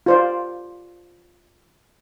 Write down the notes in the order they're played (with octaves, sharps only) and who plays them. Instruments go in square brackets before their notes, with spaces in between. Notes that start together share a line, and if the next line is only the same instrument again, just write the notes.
[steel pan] F4 C5 D5